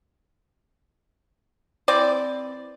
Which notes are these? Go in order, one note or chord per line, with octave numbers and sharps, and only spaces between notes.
E3 C4 D5